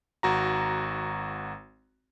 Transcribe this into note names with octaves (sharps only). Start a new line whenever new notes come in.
G#1 F#4 A#5